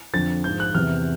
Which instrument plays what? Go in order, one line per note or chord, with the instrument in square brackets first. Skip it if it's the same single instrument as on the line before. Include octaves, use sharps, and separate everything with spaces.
[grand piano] F2 D3 F3 A6
G#2 F3 G6
F#6
E2 C3 E3 F6